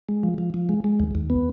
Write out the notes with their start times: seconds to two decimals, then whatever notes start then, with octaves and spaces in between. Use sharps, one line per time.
0.09 G#3
0.23 F3
0.38 F3
0.54 F3
0.69 G#3
0.84 G#3
1.00 D#2
1.15 D#2
1.30 B3